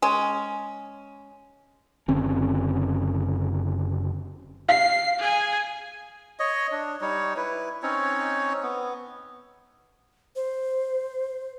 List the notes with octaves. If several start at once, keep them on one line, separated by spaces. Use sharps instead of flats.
G#3 C#4
F#1 D3 C4 C#4
F5 C7
G#4 G#5
C#5 D#5
D4
G3 D#4 C#5
E4 B4
C4 C#4 D#4 C#5
B3
C5